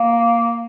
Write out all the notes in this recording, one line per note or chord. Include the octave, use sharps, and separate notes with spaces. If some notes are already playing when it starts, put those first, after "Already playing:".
Already playing: A#3